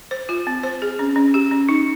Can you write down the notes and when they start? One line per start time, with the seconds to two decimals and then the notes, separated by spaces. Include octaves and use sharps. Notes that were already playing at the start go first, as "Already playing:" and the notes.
0.11 C5
0.29 F4
0.47 C4
0.64 C5
0.82 G#4
0.99 C#4
1.16 C#4
1.34 G4
1.51 C#4
1.69 D#4